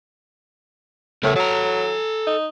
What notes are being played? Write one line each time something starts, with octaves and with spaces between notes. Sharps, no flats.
A2 C#3 B3 A#4
F#3 A4 A#5
D#4